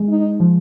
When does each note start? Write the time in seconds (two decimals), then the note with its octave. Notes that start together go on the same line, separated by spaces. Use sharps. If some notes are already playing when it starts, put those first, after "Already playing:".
Already playing: G#3
0.09 D#4
0.40 F3